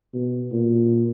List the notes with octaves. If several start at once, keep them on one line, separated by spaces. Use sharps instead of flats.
B2
A#2